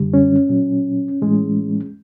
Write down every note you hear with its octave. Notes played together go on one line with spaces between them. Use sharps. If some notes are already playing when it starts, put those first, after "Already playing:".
Already playing: F#2 D3 G3
C#4
A#2 F#3
A2 E3 G#3